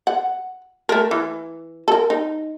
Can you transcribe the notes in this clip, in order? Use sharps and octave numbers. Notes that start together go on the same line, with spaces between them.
F#5
A3 A#4
E3
A4 A#4
D#4